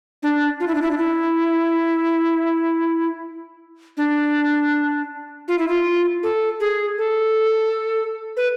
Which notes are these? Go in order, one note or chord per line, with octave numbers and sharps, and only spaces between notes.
D4
F4
E4
D4
E4
D4
E4
D4
F4
E4
F4
A4
G#4
A4
B4